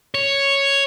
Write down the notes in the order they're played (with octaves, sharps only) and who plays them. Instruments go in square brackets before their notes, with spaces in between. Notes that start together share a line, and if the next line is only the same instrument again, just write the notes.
[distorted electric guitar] C#5